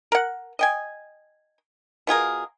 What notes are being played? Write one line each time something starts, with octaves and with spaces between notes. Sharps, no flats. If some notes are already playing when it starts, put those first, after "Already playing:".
A#4 F#5
D#5 G5 G#5
B2 F4 G#4 A#4